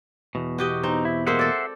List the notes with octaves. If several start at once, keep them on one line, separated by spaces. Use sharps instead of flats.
E2 B2
F#4 G4 D#5
C4 D#4
E4
G#3 A#3 C4 C5 E5 F#5
A4 D5